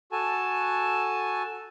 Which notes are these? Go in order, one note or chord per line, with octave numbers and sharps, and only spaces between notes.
F#4 A4 G#5 A5